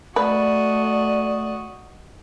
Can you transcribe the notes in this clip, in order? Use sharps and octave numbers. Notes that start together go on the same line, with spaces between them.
A3 F#4 B4 D5 D#5